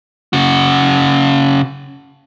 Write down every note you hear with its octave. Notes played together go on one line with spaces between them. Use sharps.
C#3 F#4